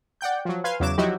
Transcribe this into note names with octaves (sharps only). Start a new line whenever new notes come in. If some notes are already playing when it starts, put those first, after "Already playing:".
D5 F#5 G5 G6
F3 F#3
B4 F5 G#5 C6
E2 C#3 F#3 D6 E7
F3 F#3 D#4 E4 F#4 G4